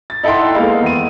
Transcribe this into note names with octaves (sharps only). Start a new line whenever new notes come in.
A6
D#4 E4 A4 F#5 G5 C6
G#3 A#3 B3 D#4 F5
E2 D#7